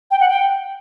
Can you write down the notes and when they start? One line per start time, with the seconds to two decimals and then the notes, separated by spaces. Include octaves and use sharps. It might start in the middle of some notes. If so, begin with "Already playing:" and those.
0.11 G5
0.20 F#5
0.29 G5